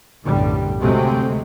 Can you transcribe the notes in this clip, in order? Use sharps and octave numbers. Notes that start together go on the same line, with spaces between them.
B1 F#2 A2 D3 G3
D2 C3 F#3 G#3 A3 C4